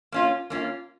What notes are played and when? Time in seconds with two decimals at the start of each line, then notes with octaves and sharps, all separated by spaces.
0.12 A#3 C#4 F4
0.50 A#3 C#4 F4